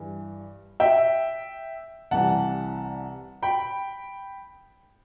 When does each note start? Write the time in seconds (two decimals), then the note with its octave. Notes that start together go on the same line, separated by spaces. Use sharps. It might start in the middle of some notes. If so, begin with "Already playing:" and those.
Already playing: G2 E3
0.80 E5 G5
2.11 C2 C3 E3 G3 F#5 A5
3.43 G5 B5